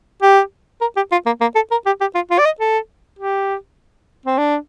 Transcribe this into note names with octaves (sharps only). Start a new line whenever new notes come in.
G4
A#4
G4
F4
A#3
A#3
A4
A#4
G4
G4
F4
F4
D5
D#5
A4
G4
C4
D4